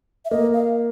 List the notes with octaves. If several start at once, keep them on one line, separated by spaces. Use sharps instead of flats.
E5
A#3 D#5
F5